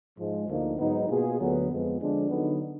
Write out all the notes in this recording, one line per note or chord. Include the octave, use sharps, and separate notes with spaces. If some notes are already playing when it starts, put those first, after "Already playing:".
G#2 F3 G#3
D2 D3 F3 A#3 D#4
G#2 F#3 B3 D#4
B2 A#3 F4 G#4
D2 D3 F#3 B3
F2 F3 G#3 B3
D3 F3 G#3 D4
D3 F#3 B3 D#4